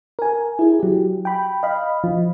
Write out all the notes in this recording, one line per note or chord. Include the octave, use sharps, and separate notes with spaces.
A#4 G#5
E4 G#4
F#3 G4
G5 B5
D#5 F5 B5
F3